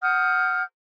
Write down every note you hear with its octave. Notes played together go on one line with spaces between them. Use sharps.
F#5 D#6 F6 G6